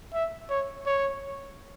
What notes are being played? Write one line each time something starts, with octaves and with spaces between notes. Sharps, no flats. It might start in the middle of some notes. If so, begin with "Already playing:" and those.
E5
C#5
C#5